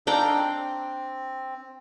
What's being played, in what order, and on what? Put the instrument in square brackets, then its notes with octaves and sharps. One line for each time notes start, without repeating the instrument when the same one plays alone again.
[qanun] D4 G5 A#5 [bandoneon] D#4 A4 F5
[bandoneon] C4